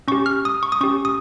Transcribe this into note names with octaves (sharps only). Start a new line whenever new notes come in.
C#4 G4 C#6
F6
D#6
C#6
D#6
C#4 G4 C#6
D#6